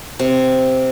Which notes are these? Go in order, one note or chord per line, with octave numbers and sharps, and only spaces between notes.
C3